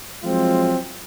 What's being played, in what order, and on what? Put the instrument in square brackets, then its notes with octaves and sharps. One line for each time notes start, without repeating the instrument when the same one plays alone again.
[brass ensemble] F3 F#3 G#3 C4 F4